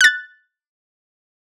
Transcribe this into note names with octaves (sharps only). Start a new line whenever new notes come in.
F#6 A6